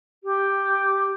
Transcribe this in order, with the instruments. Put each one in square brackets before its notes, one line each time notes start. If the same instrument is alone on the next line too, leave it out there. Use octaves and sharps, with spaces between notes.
[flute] G4